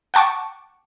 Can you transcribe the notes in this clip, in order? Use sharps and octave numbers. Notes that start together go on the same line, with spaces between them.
F#5 G5 A5 C#6 D6